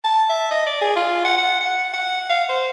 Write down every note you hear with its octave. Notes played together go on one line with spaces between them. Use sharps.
A5
E5
D#5
D5
G#4
F4
F#5
F#5
F#5
F#5
F5
C5